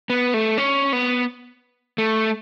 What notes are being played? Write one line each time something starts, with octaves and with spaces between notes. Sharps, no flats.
B3
A3
C#4
B3
A3